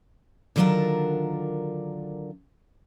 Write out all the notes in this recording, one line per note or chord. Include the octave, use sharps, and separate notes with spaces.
D3 D#3 F#3 D4 F4 A#4